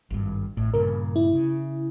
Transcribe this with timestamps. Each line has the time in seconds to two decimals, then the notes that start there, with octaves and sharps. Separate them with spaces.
0.10 G#1 G2
0.57 A1 A2
0.74 G2 A#2 C#3 A#4
1.16 E4
1.33 C#3